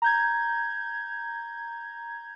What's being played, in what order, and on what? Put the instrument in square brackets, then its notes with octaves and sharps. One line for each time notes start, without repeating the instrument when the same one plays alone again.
[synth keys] A#5 G6 G#6